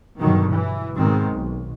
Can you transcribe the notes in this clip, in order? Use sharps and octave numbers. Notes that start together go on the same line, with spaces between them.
G2 B2 D3 D#3 F#3
E3
G#2 B2 D#3 G#3 C4
B1